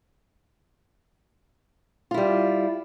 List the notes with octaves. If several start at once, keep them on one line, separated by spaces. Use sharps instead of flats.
G3 E4 F4